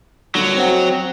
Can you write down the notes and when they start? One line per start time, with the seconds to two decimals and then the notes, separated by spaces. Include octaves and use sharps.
0.35 G2 A#2 D3 F#3
0.57 C4 F#4